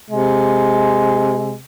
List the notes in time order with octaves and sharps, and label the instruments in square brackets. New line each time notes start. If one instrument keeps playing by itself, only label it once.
[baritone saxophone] C3 [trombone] G#3